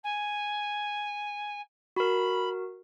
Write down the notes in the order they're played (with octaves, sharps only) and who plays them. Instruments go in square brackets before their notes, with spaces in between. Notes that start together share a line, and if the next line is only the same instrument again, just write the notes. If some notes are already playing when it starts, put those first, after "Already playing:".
[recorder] G#5
[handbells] F#4 A#4 [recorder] B5